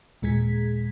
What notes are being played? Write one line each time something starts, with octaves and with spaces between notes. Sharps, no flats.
D#2 A#2 G#3 G#4 G#6 B6